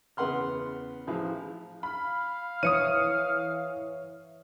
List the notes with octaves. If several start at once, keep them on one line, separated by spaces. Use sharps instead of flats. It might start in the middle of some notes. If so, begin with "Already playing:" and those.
E2 C#3 B4 F#5 C6 F6
A1 F3 E4 G#4 F5
F5 B5
E3 C#5 E5 D#6 C#7 D#7